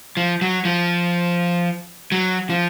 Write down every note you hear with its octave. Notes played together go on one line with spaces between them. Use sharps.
F3
F#3
F3
F#3
F3